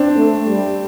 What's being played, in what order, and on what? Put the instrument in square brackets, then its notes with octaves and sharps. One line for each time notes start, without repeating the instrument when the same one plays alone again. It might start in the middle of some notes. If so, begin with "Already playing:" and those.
Already playing: [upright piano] C4 D4
[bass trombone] A3
G3